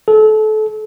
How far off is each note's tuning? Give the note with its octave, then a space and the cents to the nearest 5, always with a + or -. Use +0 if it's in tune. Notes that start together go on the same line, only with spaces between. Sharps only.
A4 -30